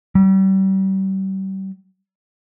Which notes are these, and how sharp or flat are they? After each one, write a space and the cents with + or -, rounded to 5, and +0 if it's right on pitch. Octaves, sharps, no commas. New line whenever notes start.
G3 -35